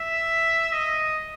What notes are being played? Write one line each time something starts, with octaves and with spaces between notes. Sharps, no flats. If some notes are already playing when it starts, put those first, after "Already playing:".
Already playing: E5
D#5